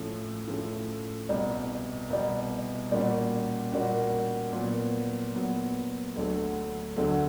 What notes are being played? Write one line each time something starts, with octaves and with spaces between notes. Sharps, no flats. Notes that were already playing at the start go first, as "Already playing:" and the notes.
Already playing: A2 F3 A3 C#4
A2 F3 A3 C#4
C2 B2 G3
C2 B2 G3
A#2 G3 A#3 C#4 F#4
A#2 G3 A#3 C#4 F#4
A#2 F#3 B3
A#2 F#3 B3
D2 D3 F#3 A3
D2 D3 F#3 A3